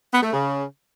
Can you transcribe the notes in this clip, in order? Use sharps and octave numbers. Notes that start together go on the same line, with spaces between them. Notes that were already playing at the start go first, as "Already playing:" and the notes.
B3
A3
C#3